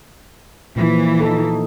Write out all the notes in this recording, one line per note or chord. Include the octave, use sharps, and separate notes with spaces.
A#2 E3 F3
D#4 A4